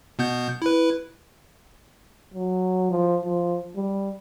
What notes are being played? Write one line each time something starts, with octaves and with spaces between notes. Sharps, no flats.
B2 B3 G6
E4 B4
F#3
F3
F3
G3